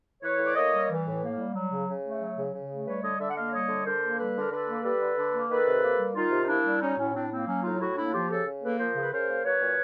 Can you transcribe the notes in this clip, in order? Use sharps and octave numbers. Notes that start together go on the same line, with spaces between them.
E3 B4 C#5
A2
D5
A#3 C#5 D#5
G3
E3
A2
A#3
G3
F#3
C#3
C#3
A3
F#3
C#3
C#3
A3
G3 B4 C#5
D3 C#5 D#5
D3 D5 E5
F#5
A#3 D#5 F5
G3 C#5 D#5
D3
D3 A#4 C5
A#3
G3 A4 B4
D3
A#4
D3 A4 B4
A#3
G3 A4 B4
D3
D3
A#3
D#3 A4 B4
C3
A#3
G3
D#3 D#4 F4
C3
D#4
A#3 D4 E4
G3
F#3 C#4 D#4
A2 C#4
A2 C4 D4
A#3 C4
F#3 C#4
A2 D#4 F4
A2 E4 F#4
A#3 D4 E4
F3 F4 G4
C#3 G4 A4
C#3
A#3 A4 B4
F3 A#4 C5
C#3 B4
C#3 A#4 C5
A#3
F#3 B4 C#5
A#2